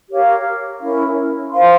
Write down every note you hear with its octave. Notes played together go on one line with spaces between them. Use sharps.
G4 A#4 C#5 F5
C#4 E4 A#4
C5 F5 C6